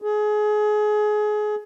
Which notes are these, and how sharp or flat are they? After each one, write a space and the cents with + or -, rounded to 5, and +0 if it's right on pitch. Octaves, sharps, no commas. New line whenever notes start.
G#4 +25